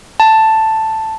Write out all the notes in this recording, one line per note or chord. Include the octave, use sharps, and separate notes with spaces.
A5